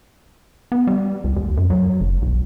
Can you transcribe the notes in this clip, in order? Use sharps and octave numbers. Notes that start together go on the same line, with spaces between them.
B3
G3
C#2
D#2
F#2
F#3
F#1
B1